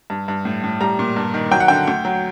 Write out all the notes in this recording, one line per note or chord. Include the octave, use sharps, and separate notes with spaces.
G2
G2
A2
A2
G3 A#5
A#2
G2
D#3
F#3 G5
F#5
D3 G5
D2
F#3